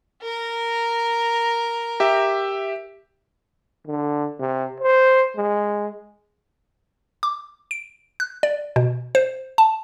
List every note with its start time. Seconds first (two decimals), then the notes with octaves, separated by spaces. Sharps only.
0.23 A#4 A#5
2.00 G4 E5
3.87 D3
4.40 C3
4.80 C5
5.36 G#3
7.23 D6
7.71 D7
8.20 F#6
8.43 D5
8.76 B2
9.15 C5
9.58 A5